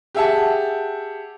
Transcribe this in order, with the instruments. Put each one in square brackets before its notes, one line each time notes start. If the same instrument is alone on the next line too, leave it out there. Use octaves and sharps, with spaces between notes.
[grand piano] G4 G#4 E5 F#5 A5